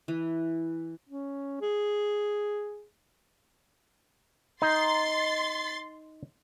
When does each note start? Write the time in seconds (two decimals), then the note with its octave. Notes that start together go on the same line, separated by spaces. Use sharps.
0.08 E3
1.09 C#4
1.61 G#4
4.62 D#4 C6 A6 C7